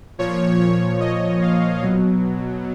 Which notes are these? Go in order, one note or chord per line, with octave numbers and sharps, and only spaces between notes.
A#2 F3 C#5
C#5
D#5
F5
B2 F#3